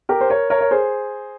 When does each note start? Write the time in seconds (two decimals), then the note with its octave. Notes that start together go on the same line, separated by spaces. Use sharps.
0.09 G4 A#4
0.21 C5
0.29 A#4 C#5
0.50 A#4 C#5
0.61 C#5
0.71 G#4 C5